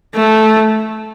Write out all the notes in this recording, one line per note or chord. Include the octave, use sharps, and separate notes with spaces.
A3